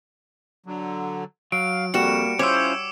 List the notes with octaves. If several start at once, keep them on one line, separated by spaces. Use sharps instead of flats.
D3 F#3
F#3 F5 D7
F2 G3 A#3 F#4 C#7 E7
C#4 E4 F4 C5 C#5 D6 E6